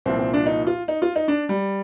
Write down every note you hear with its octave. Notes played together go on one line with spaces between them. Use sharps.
C2 A#2 F3 C4
C4
D4
D#4
F4
D#4
F4
D#4
D4
G3